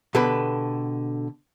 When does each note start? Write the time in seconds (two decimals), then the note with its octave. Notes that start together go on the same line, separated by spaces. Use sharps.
0.15 B2 D3 G4 A4 B4